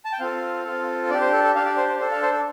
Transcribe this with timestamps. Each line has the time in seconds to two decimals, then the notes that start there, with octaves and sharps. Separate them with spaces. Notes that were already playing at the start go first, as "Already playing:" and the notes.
0.05 A5
0.12 G5
0.20 C4 F4 A4 F5
0.65 C4 F4 A4
1.10 D4 D5
1.14 G4
1.21 C5
1.33 A4
1.44 A4
1.55 D4 G4 F5
1.66 D5
1.77 C5
1.88 C5
1.99 D4 A4 C5
2.11 F5
2.23 C5
2.33 A4